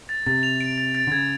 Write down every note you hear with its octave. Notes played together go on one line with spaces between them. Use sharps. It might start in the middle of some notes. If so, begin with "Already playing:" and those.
A6
C3 A6
F7
D7
A6
A6
D3
C#3 G#6